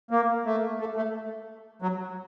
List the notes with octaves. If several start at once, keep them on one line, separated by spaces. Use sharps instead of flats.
A#3
A3
A3
A3
F#3